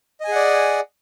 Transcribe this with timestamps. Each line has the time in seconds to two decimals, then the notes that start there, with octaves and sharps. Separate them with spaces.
0.21 D#5
0.24 G#5
0.28 G#4
0.32 F#5
0.35 D5